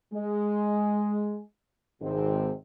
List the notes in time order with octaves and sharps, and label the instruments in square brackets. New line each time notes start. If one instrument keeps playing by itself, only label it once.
[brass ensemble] G#3
G#1 C3 G#3 C4